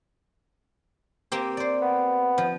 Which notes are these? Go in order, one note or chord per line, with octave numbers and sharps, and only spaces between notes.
A#3 C4 G4
C5 D5
B3
F3